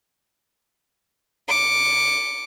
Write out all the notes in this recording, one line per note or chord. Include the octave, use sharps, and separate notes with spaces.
D6 C#7